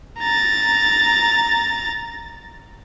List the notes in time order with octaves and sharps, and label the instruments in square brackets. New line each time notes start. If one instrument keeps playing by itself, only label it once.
[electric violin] A#5 A6